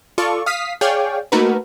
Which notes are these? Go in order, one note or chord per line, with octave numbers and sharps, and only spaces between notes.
F4 A4 D5 C#6
F5 D#6 F6 B6 C7
G#4 C#5 D5 F5 G5
A3 A#3 D#4 F#4 A#4 B4